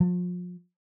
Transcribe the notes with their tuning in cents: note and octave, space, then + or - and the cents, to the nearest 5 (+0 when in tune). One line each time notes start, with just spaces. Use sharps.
F3 +35